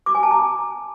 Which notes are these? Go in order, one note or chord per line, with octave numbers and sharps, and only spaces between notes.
D6
G#5
A5
A#5